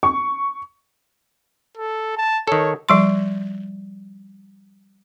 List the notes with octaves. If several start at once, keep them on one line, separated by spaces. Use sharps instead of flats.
C#6
A4
A5
D#3 A4 C#5
F3 G3 C6